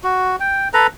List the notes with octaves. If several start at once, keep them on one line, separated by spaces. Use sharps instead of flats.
F#4
G5
A4 B4 A#5